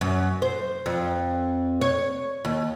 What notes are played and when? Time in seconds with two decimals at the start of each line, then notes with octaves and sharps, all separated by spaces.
0.01 F#2
0.42 C5
0.86 F2
1.81 C#5
2.45 D#2